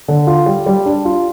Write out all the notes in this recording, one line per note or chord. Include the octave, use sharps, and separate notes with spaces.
D3
F4
G3
G3
D4
F4